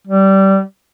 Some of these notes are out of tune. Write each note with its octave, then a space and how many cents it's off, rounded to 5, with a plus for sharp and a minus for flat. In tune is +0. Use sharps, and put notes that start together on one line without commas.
G3 -20